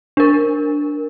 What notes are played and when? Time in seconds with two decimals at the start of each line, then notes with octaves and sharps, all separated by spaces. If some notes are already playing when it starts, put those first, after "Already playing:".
0.17 D4 A#4